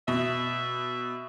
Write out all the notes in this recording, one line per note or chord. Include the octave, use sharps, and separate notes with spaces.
B2 E5